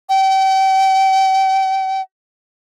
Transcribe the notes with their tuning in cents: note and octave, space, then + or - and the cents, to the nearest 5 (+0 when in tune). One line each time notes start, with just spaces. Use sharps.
G5 -35